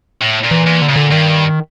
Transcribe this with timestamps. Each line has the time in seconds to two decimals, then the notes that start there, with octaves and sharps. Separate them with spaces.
0.22 A2
0.44 A#2
0.51 E3
0.67 A#2
0.82 D3
0.89 A#2 C#3
0.96 D3
1.12 G2 D#3